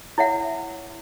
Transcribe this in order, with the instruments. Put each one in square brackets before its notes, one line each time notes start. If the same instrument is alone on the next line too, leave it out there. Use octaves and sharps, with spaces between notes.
[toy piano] E4 C#5 E5 F#5